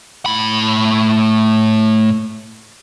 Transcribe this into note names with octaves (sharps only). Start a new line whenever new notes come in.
A2 B5